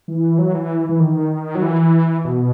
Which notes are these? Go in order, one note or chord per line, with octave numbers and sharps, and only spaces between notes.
E3
F#3
E3
E3
D#3
F#3
E3
B2